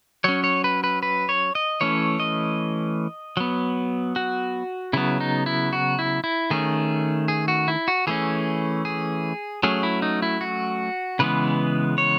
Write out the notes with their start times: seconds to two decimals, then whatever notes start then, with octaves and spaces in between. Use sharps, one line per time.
0.24 F#3 C#4 C#5
0.44 C#5
0.64 B4
0.84 B4
1.03 B4
1.29 C#5
1.55 D#5
1.81 E3 A3 C#4 C#5
2.20 D#5
3.37 F#3 B3
4.16 F#4
4.93 C#3 F#3 B3 E4
5.21 D#4
5.46 E4
5.73 F#4
5.99 E4
6.24 E4
6.50 D#3 A3 C#4 G#4
7.28 G#4
7.48 F#4
7.68 E4
7.88 F#4
8.07 E3 A3 C#4 G#4
8.85 G#4
9.63 F#3 A3 C#4 G#4
9.83 E4
10.02 D#4
10.22 E4
10.41 F#4
11.19 C#3 E3 G#3 B3 B4
11.98 C#5